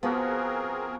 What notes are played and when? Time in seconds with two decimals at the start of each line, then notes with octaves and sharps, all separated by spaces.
0.03 F3 B3 C4 F#4 G#4 A#4